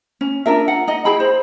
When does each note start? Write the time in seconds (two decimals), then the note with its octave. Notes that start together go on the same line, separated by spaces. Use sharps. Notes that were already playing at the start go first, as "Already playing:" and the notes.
0.21 C#4
0.46 D4 F4 A#4 E5
0.68 F#5
0.87 D#4 D#5
1.05 E4 G#4 G5 B5
1.20 C5